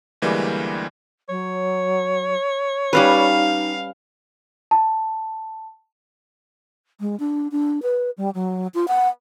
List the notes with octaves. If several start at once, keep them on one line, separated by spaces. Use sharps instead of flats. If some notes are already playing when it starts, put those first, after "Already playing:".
D2 E3 G3 G#3 A#3
F#3 C#5
G3 C#4 D#4 B4 F5
A5
G#3
D4
D4
B4
G3
F#3
F4
F#5